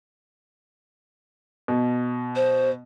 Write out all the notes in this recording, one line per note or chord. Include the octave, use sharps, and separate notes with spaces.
B2
C5